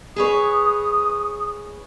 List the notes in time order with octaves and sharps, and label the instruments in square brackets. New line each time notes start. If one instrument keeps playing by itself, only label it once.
[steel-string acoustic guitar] G#4 B4 C#5 [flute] D#6